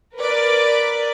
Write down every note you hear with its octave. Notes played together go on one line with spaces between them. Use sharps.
A#4 B4 D5